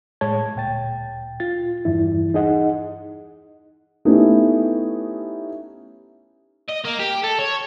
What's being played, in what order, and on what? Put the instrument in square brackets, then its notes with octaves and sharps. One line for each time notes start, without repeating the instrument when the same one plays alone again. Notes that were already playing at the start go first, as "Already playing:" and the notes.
[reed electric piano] A2 G#3 C#5 A5 G#6
D2 A#2 G5 A6
F4 A6
E2 G2 E3 E4
D#4 G#4 D#5 F#5
[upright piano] A3 B3 C#4 D#4 E4 G4
[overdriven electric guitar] D#5
A#3
G4
A4
C#5